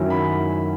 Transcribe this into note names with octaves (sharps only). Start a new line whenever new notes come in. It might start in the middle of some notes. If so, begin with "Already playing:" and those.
Already playing: F#2 D#3 F#3 C#4 E4
B5